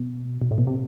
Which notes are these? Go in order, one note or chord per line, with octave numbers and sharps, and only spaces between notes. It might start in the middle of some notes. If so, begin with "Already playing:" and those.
Already playing: B2
B2
A2
B2
C3